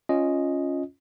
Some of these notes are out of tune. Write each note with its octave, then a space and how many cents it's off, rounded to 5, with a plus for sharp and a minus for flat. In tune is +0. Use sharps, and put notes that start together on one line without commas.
C#4 +0 F4 +0 D#5 +0